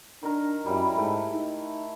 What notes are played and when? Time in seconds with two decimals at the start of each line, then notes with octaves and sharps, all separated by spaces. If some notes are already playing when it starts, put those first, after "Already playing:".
0.23 D#3 D4 A#4
0.66 F#2 G3 E4
0.96 G#2 A3 G5
1.33 D#4